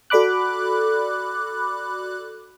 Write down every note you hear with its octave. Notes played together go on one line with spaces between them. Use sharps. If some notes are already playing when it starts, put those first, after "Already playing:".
F#4 A4 D5 B5 D6 F#6